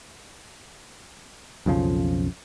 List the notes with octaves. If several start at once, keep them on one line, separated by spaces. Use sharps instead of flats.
B1 F2 C#3 F3